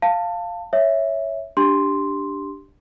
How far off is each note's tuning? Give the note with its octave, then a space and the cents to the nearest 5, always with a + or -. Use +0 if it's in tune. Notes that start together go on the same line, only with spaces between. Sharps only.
F5 +0 A5 +20
C#5 +0 E5 +0
D4 +0 G4 +5 C6 +0